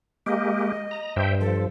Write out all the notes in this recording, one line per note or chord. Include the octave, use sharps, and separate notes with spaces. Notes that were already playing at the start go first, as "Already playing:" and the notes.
G#3 A#3 G4 D#5
A#5
G2 C5 E5 G5
F3 A4